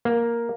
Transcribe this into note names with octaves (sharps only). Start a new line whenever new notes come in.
A#3